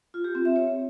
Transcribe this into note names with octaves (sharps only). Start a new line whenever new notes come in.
F4
G4
C4
E5
C#5